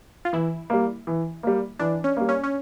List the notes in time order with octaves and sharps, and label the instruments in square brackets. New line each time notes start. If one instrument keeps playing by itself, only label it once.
[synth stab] F4
[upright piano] E3 [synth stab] E4
[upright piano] G3 A#3
E3
G3 A#3
[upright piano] E3 [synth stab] D4
[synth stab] C#4
[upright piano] G3 A#3
[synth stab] C#4
C#4